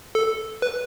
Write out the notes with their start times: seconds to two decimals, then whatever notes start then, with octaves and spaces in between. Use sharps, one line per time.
0.15 A4
0.62 B4